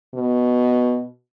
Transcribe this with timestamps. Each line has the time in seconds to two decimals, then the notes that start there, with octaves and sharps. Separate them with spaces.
0.14 B2